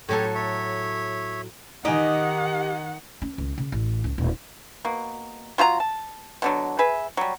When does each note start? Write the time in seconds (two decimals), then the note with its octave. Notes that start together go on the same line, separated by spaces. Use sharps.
0.09 A2 F#3 G4 A4 C#5
0.35 C#5 E5
1.85 D#3 D#4 G4 D#5 F#5 G#5
3.22 C#4
3.38 C#2
3.58 C#3
3.72 A1
4.04 C#2
4.18 D#1
4.85 B2 A#3
5.58 F#3 F4 B4 A#5
5.80 A5
6.42 B2 D3 F#3
6.79 G#4 B4 E5
7.17 F#3 G3